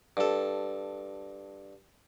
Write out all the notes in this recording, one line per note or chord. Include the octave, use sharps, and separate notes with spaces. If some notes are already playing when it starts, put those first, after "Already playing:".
G2 A4